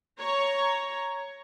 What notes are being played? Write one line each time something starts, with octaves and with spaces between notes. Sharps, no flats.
C#5 A#5